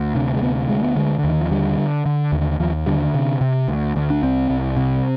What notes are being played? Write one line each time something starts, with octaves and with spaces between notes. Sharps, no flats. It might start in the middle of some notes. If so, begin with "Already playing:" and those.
Already playing: D2
C3 D4
G#3
D2 B3
D2 G#3
B3
D3 G#3
D3
D#2
D#3
F3
D3 G3
D3
D3
D#2
D#2 F3
D3 G3
C3
C3
D2
D2
D4
C2 C4
C2
C3